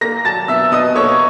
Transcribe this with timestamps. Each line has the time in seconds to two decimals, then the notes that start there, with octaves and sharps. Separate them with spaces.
0.01 A#3 A#5 A#6
0.25 F#3 A5 A6
0.48 B2 E5 E6
0.72 B2 D#5 D#6
0.96 A#3 C#5 C#6